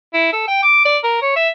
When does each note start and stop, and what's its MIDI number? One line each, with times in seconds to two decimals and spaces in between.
0.14 0.32 64
0.33 0.43 69
0.48 0.60 79
0.63 0.82 86
0.85 0.98 74
1.04 1.20 70
1.22 1.36 73
1.36 1.49 76